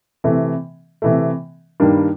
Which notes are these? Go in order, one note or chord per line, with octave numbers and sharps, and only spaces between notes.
C3 E3 A3
C3 E3 A3
G2 D#3 G3 A#3 D4